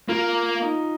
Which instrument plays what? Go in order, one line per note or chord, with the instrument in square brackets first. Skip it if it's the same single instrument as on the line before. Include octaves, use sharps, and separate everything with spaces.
[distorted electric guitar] A#3 [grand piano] F4
[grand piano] D#4